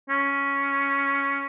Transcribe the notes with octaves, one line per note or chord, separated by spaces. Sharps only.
C#4